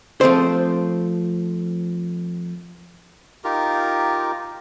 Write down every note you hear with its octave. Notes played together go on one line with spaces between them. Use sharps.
F3 A3 C4 C5
D#4 F4 G4 A#4